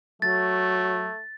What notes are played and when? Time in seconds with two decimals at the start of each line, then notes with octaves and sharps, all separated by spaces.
0.22 F#3 A3 A6